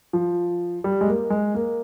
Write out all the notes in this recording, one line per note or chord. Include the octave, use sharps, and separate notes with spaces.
F3
G3
G#3
A#3
G#3
A#3